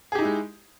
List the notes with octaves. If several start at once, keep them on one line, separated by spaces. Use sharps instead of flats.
G#3 D#4 E4 G4 G#4